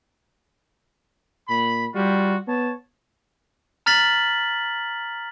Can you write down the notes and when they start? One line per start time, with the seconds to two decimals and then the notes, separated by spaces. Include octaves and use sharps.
1.49 A#2 B5
1.95 G3 F4 F#4
2.48 B3 C#5 A5
3.86 A#5 F6 A6 B6 F#7